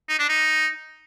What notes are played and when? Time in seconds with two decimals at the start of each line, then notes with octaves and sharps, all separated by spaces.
0.09 D#4
0.19 D4
0.29 D#4